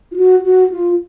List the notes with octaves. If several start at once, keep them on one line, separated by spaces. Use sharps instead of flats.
F4
F#4
F#4
F4